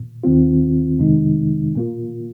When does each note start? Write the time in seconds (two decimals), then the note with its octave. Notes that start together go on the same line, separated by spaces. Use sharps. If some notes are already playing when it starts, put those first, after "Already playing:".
Already playing: A#2
0.24 D#2 D#3 C4 F4
0.99 F2 C3 D#3 G#3 D#4
1.75 A#2 A#3 F4